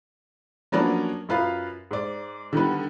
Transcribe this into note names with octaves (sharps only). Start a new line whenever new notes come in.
F3 F#3 A#3 B3 C#4 D4
F#2 F4 B4 F5
G#2 D5
D3 D#3 G3 B3